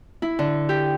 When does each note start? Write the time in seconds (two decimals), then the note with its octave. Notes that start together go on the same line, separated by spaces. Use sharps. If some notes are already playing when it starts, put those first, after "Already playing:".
0.22 E4
0.39 D3
0.69 G4